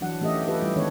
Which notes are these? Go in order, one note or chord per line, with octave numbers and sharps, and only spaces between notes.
E3 F#3 D4 F#5
E3 A3 C#4 G4 D#5 E5
F4 G4 A4 B4
G3 E4
D#3 G#3 B3 D4 A4 C#5